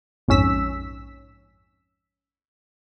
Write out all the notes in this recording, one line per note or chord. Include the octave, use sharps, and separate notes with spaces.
A#1 F2 G#2 C#4 E6 B6